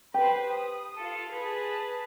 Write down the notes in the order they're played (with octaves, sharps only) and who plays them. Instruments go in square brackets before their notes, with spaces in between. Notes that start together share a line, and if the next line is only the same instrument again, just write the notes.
[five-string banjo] G4 [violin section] B4 C5
[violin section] D#6
F4 A4
G#4 B4 A5